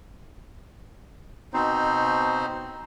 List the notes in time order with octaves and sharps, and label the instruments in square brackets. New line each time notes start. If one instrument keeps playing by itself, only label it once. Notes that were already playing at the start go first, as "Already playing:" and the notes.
[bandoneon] B2 C4 D#4 C5